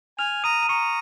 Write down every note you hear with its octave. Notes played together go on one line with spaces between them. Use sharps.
G#5 F6 F7
A#5 D#6 D#7
D#7
A#5 C#6 C#7